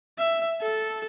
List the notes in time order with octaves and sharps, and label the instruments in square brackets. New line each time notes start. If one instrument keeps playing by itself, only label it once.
[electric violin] E5
A4